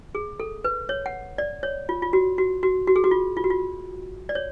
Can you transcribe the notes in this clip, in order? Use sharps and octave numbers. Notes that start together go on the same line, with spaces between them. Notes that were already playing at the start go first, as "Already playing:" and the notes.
G#4
A4
B4
C#5
F#5
D5
C#5
F4
F4
F#4
F#4
F#4
F#4
G#4
F#4
F4
F4
F#4
F4
D5
C#5